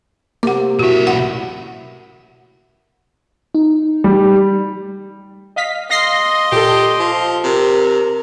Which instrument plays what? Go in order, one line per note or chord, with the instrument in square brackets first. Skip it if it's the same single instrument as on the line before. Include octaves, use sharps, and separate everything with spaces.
[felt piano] C3 [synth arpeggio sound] A#3 [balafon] F#5 D6
[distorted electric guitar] B1 E5 [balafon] E4 F#4
[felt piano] A1 E4 [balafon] F#5
[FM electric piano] D#4
[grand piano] G3
[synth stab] D#5 F5 B6
[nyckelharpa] D#5 C6 [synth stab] F5 A#6 C7
[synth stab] A#2 A4 [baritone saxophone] G4
[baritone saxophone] F3
[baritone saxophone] C3 [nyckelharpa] A#4